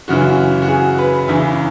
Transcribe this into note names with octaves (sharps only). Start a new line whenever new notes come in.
F#2 C#3 E3 F#4
F#4
G#4
B4
E2 C#3 E3 E5